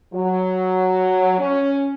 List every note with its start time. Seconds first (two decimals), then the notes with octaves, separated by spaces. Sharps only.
0.14 F#3
1.39 C#4